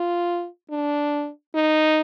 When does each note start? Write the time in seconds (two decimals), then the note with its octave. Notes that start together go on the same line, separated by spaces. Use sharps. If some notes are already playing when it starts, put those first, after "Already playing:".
Already playing: F4
0.71 D4
1.55 D#4